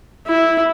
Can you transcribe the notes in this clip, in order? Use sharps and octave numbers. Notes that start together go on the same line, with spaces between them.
E4